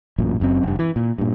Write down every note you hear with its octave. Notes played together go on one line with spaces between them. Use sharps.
A1 F#2 A#2
F#1 F#2 A2 C4
F1 G2
E3
A#2
G2 A#2